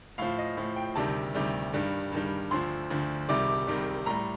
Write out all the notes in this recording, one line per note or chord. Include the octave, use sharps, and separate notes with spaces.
A2 F3 F5
D#5
A2 F3
G5
D2 C3 D#3 G3 A5
D2 C3 D#3 G3
G2 D#3 G3
G2 D#3 G3
D2 D3 F3 C6
D2 D3 F3
C2 C3 D#3 G3 D6
D6
C2 C3 D#3 G3
A2 G3 A#5